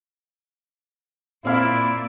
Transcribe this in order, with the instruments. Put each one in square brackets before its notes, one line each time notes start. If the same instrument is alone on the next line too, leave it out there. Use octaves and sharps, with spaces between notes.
[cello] A#2 D5 [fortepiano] C4 F5 [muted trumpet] E4